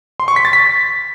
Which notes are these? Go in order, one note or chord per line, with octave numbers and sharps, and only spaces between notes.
C6
C#6
B6
A6
B6